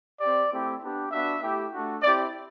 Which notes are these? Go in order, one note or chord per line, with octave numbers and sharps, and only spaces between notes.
C4 G4 D5
A3 C4 E4 G4
B3 D4 G4
B3 D4 F#4 E5
A3 E4 G4
A3 D4 F#4
C4 E4 G4 D5